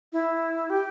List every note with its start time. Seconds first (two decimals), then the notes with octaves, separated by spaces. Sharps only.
0.13 E4
0.70 G4